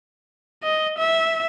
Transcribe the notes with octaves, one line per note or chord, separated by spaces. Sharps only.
D#5
E5